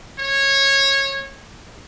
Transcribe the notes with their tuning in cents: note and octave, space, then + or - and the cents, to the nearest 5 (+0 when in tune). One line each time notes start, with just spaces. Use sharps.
C#5 -20